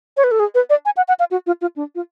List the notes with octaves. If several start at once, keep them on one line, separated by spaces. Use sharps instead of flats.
C#5
B4
A4
G#4
B4
D5
G#5
F#5
F#5
F5
F#4
F4
F4
D4
F4